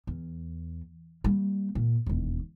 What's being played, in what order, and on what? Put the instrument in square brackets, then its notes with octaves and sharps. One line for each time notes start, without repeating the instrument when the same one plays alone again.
[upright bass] E2
G3 A#3
A#2
E1 D#2